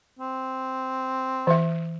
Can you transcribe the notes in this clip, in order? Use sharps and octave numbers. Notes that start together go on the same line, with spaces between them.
C4
E3 E5